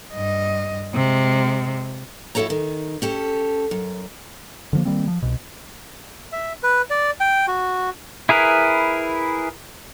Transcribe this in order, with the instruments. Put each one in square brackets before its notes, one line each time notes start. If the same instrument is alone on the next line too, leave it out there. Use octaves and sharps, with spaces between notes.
[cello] G2 D#5
C3 G#3
[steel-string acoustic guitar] F2 E4 F#4 A4 C#5 A#5
D#3
C#4 G4 A4
F#2
[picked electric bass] D3 F3 A#3
D#3 G3 A#3 C4
F3
C2 B2
[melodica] E5
B4
D5
G5
F#4
[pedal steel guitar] E4 G#4 A#4 B4